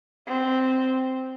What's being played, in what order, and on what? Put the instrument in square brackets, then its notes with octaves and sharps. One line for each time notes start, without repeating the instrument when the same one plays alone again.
[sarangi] C4